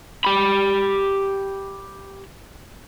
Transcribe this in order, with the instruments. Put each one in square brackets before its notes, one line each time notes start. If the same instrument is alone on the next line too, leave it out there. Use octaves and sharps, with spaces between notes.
[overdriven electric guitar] G4 B5